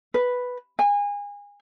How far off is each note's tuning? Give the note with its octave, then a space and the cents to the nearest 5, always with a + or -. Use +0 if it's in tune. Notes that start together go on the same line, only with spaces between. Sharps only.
B4 +0
G#5 -30